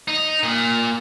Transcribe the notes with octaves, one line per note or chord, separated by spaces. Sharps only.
D#4
A#2